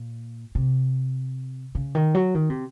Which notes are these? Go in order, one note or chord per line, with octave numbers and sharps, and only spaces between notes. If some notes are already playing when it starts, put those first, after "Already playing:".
Already playing: A#2
C3
C#3
D#3
F#3
D#3
C3